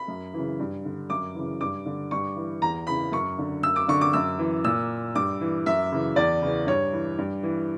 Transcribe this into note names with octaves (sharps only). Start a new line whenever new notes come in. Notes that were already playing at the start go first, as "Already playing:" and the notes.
Already playing: B5
F#2
C#3 E3
G2
D3
F#2 D6
C#3 E3
G2 D6
D3
G2 C#6
E3
E2 A#5
C#3 E3 B5
F#2 C#6
D3
F#2 E6
D6
D3 C#6
D6
F#2 E6
E3
A#2 E6
G2 D6
E3
F#2 E5
C#3 E3
E2 D5
C#3 E3
G2 C#5
E3
G2
E3